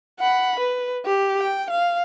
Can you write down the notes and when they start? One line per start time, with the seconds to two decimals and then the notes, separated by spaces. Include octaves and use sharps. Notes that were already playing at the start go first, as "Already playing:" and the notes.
0.20 F#5 B5
0.60 B4
1.06 G4
1.39 G5
1.70 F5